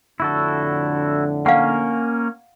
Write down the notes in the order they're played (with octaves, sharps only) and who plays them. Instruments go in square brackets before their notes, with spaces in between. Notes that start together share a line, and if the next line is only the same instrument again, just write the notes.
[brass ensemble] F2 A2 D3 [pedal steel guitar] E4 F#4 A4
[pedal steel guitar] A#3 C#4 A#4 [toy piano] F5 F#5